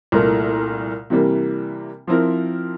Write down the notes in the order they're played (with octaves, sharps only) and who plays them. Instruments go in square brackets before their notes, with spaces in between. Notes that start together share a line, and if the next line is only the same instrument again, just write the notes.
[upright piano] C2 A#2 A3 E4 A#4
C3 E3 G3 A#3
F3 C4 E4 A#4